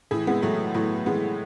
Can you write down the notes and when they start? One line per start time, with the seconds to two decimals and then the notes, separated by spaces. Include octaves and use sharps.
0.11 A2 E3 E4 G#4
0.27 G#3 B3
0.42 A2 E3 F#3 A3
0.74 A2 E3 F#3 A3
1.06 A2 E3 G#3 B3